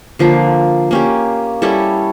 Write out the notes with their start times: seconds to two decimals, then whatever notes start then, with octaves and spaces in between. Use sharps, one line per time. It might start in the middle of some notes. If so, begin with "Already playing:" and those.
0.19 D3 F3 A#3
0.91 A#3 C#4 G4
1.62 G3 C#4 E4 A4